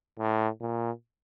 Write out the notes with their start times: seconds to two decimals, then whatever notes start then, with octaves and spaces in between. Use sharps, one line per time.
0.19 A2
0.61 A#2